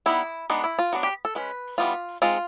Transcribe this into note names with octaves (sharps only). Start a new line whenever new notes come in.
G3 B3 D#4 E4
G#3 B3 D4 D#4
E4
F4
F#3 B3 D4 F#4
G4
A4
G#3 C#4 B4
E3 G3 B3 D#4 F4
G#3 C4 D#4 F4